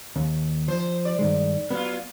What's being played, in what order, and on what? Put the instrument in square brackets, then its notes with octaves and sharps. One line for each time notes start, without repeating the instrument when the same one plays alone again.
[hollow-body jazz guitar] D#2
[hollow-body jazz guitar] F3 [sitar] C5
[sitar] D5
[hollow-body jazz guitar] G2 D#3 G#3
[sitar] F#3 F4 [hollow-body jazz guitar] B3